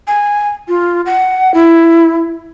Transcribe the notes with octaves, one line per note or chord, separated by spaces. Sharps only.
G#5
F4
F#5
E4